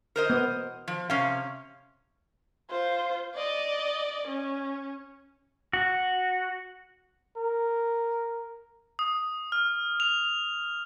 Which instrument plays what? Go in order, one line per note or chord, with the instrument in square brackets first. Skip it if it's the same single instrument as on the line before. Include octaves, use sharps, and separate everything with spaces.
[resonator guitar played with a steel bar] A#4 C5 D#5
[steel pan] B3
[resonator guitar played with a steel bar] F3
[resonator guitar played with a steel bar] C3 C#4 [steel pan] F5
[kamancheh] F4 C5
D5 D#5
C#4
[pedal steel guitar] F#4
[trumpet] A#4
[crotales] D#6
F6
F7